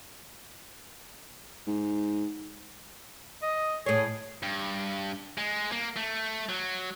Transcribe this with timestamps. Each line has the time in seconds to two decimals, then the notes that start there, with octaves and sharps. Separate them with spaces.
1.67 G#2
3.42 D#5
3.86 A2 G#4 C#5
4.43 G2
5.38 G#3
5.72 A#3
5.96 A3
6.49 F#3